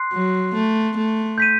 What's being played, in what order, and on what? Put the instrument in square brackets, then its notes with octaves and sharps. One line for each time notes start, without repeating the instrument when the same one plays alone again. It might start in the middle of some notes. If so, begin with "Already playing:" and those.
Already playing: [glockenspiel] C6 F#6 C7
[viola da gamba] F#3
A3
A3
[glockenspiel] G6 B6 D#7